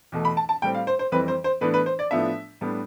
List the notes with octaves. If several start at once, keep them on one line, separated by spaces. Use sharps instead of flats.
E2 B2 A3
B5
A5
A5
A2 G3 C4 G5
F5
C5
C5
F2 E3 G3 C4 B4
C5
C5
A2 E3 B3 D4 B4
B4
C5
D5
A2 F3 B3 D4 E5
A2 G3 B3 D4